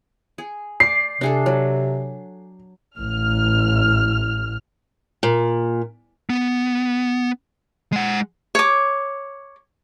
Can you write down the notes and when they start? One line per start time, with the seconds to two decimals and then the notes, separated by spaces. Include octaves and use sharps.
0.38 G#4
0.80 D5 C7
1.21 C3 D4 G#4 A4
1.46 F#3
2.98 A1 F6
5.23 A#2
6.30 B3
7.92 G#3 F#5
8.55 C#5 D6